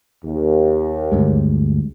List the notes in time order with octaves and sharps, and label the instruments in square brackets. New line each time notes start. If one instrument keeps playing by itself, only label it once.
[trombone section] D#2
[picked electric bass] D2 G2 G#3